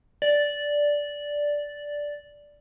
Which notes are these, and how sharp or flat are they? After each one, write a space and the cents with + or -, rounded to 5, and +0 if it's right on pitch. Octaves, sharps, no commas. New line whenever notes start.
D5 -5